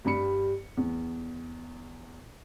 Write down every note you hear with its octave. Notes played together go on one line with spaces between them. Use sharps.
G2 G3 B5 C#7
E2